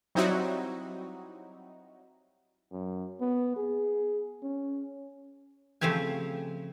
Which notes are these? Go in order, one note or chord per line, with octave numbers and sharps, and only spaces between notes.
F#3 G3 C4 D#4 E4 F#4
F#2
B3
G#4
C#4
C#3 F3 A3 C4 G4 G#5